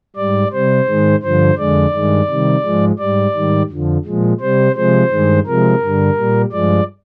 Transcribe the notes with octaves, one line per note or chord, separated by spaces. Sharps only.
G#2 G3 D5
C3 G3 C5
G#2 D#3 G#3
G2 D3 F3 C5
F2 D3 G#3 D5
G2 D#3 G#3
C3 D#3 G3
G#2 F3 G#3
G#2 G3 D5
G#2 D#3 G3
F2 D3 F3
A#2 F3 G#3
C3 G3 C5
C3 F3 G#3 C5
G2 D#3 G#3
C3 F3 G#3 A#4
G2 D3 G3
A#2 G3
G2 F3 G#3 D5